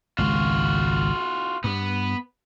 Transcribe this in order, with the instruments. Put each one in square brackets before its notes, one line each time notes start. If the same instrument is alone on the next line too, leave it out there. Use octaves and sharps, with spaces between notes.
[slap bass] G#1 C#2 [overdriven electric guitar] F4 F#4
[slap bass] G2 [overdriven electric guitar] B3